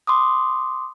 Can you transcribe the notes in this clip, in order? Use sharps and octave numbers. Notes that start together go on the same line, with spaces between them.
C6 D6 D#6